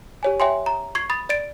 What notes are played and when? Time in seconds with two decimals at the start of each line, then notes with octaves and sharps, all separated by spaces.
0.23 G4 C#5 G#5
0.40 C#5 E5 G5 G#5 C6
0.66 A#5
0.95 C#6 G#6 C7
1.10 B5 D#6 A6
1.29 D5 A6 D7